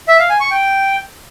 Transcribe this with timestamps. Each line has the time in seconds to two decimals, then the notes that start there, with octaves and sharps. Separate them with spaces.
0.08 E5
0.19 F5
0.30 G#5
0.40 C#6
0.51 G5